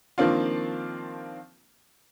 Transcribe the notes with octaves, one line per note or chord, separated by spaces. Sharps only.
D#3 F3 A#3 C4 D4 F4